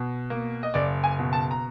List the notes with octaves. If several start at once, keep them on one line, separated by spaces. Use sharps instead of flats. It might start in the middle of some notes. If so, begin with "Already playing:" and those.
Already playing: B2
A#3
D#5
F#1 D5
G#5
B2
A5
A#5